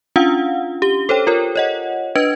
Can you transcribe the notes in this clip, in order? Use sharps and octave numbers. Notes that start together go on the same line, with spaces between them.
C#4 D4 F4 F5 F#5
G4 G7
A4 C5 C#5 G5
F4 A#4 C#5
C#5 D#5 F#5
D4 B4 D#5 G#6 D7